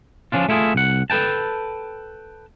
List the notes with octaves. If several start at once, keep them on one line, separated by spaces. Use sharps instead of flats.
F3 C#4 D4 F4
A3 E4 F4 G#4
C2 F#5
A4 B4 G5 A5